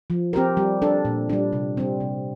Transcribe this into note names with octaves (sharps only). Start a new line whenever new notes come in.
F3
C4 G4 A#4
G3
D4 A4
A#2
G3 D4
C3
G3 C4
C3